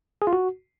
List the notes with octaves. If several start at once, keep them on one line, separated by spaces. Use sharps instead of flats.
G#4
F4
F#4